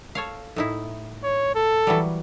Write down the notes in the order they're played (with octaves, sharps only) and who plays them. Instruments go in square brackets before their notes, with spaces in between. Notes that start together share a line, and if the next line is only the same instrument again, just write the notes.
[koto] A4 C#5 F5
A2 D#4 E4
[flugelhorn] C#5
A4
[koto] E3 F#3 G3